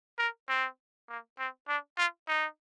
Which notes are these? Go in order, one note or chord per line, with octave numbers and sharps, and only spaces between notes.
A#4
C4
A#3
C4
D4
F4
D#4